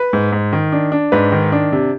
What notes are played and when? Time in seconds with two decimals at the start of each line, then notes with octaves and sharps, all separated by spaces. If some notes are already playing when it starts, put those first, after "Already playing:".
Already playing: B4
0.13 G#2
0.32 G#2
0.52 D#3
0.72 D4
0.92 D4
1.12 G#2 B4
1.32 D#3
1.52 D4
1.72 C3